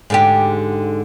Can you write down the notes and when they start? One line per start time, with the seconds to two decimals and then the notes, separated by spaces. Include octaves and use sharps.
0.10 G#2 D3 G4